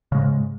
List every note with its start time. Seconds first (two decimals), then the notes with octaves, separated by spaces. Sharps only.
0.12 C#3
0.15 G#3
0.17 G#2